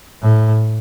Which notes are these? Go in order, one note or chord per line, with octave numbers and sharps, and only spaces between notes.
A2